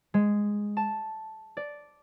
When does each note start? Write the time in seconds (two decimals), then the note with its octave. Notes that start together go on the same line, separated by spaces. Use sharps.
0.14 G#3
0.77 A5
1.57 D5